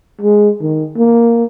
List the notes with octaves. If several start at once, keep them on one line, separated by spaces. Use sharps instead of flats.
G#3
D#3
A#3